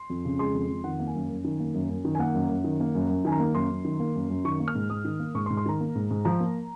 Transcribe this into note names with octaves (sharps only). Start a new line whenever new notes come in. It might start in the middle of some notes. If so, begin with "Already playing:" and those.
Already playing: C6
F2
C#3
G#3 C6
F2
F2
D#3 F#5
A#3
G#5
F#2
F#2
D#3
A#3
F#2
F#2
D#3
G#5
A#3 F#5
F#2
F#2
D#3
A#3
F#2
F#2
D#3 G#5
A#5
A#3
F#2 C6
F#2
D#3
A#3
F#2
F#2
D#3 C#6
A#3
F6
G#2
G#2 D#6
D#3
A#3
G#2 C#6
C6
G#2
C6
D#3 A#5
A#3
G#2
G#2
F3 A#5
A#3